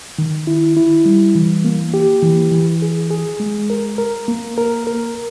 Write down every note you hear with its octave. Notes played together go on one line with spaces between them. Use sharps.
D#3
E4
E4
G3
E3
A#3
G4
E3
E3
G#4
G#4
G#3
A#4
A#4
A#3
A#4
A#4